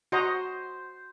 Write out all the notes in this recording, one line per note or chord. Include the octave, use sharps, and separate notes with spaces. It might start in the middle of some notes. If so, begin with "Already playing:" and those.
F#4 C5 D#5 A#5